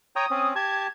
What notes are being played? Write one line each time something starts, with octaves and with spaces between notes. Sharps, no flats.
C#5 G5 A#5 D#6
C4 C#4
G4 A5 G#6